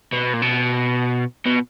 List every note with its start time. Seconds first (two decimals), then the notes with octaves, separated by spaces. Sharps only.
0.13 B2
0.34 A#2
0.42 B2
1.46 B2